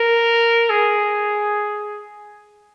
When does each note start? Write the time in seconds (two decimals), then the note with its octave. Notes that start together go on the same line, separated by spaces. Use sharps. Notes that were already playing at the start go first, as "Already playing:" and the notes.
Already playing: A#4
0.70 G#4